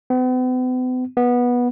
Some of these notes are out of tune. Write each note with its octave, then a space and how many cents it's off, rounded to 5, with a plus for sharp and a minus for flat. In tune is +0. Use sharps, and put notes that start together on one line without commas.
B3 +45
B3 -15